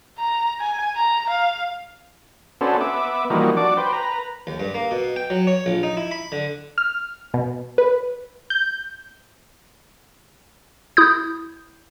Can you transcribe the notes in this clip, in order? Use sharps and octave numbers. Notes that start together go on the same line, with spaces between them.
A#5
G#5
A#5
F5
B3 C#4 D4 F#4 A4 C5
B3 E5 D6
E3 F3 G3 A#3 D#4 F#4
D4 F#4 D5 D6
B4 C5 G5
B4 A#5
D#2
G2
A#3
B2
G5
F#3
C#5
A#1
D#4
E4
B5
D3
F6
B2
B4
G6
E4 D#6 G6